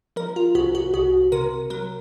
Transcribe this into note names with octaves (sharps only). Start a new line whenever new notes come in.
F3 A#4
F4
C2 F#4
F#4
C2 F#4
C3 A#4
F#3 A#4